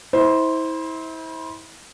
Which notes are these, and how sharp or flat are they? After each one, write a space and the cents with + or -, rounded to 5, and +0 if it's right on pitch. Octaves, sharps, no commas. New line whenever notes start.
E4 -35 C5 +0